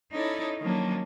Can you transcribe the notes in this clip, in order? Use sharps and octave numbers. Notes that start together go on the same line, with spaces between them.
C#4 D#4 E4 A4 C#5 D5
D#3 F3 F#3 A#3 C#4 D4